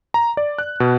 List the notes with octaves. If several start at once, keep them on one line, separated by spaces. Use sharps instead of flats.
A#5
D5
F#6
B2